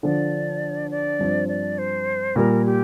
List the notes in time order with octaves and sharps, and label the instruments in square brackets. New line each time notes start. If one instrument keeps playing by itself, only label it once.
[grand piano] D3 F3 D4 [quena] D5
[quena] D5
[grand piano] G2 F3 C4
[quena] D5
C5
[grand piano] A#2 G3 A#3 [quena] A#4
[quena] G4